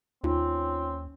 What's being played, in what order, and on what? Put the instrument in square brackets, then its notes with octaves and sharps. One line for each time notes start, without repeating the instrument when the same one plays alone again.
[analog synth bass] D#2 [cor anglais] C4 [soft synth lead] C#4 [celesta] D#4 F4